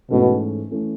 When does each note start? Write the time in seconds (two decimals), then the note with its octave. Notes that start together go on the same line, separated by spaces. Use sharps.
0.10 G#2 B2 E3 A3 C#4
0.71 E3 A3 C#4